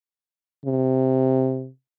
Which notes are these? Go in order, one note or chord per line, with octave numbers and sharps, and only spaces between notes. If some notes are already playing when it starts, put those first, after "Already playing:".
C3